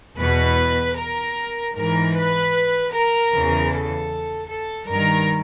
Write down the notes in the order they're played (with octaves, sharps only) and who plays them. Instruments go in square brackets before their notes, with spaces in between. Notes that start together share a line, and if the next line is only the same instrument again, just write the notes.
[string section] E2 B2 B4
A#4
G#2 E3 A#4
B4
A#4
E2 C#3 E3
A4
A4
G2 D#3 A#4